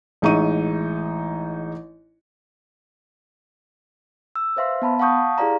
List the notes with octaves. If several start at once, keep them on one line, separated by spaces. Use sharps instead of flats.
A1 G#3 D#4 E5 C#6 D#7
E6
B4 C5 E5 F5 C6
B3 A5 B5
F5 F#5 A5 C#6 D#6 G6
E4 G4 G#4 D5 F5 A#5